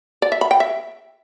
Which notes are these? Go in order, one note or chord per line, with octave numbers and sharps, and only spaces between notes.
D5
E5
B5
G5
E5